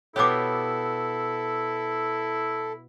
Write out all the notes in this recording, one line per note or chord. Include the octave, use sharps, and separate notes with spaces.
B2 B3 E4 G4 A4 C#5 D6